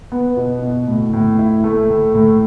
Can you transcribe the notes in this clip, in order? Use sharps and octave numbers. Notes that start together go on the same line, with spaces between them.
B3
B2
B2
A2
A2
E4
A3
A2
A2